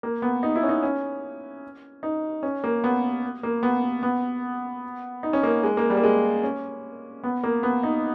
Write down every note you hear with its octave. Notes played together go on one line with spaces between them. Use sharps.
A#3
B3
D#4
E4
C#4
D#4
C#4
D#4
C#4
A#3
B3
A#3
B3
B3
D#4
C#4
A#3
G#3
A#3
G3
A#3
G#3
C#4
B3
A#3
B3
D#4